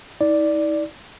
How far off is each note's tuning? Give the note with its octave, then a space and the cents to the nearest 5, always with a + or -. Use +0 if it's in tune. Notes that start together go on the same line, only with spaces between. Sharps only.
D#4 +45 D5 +0